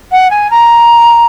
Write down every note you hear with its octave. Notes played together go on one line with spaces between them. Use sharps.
F#5
G#5
A#5